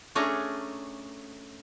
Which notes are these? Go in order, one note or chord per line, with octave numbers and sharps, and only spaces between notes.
A3 C#4 D4 G#4 A#5